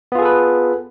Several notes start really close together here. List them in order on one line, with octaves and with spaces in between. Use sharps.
B3 F4 G#4 A4 B4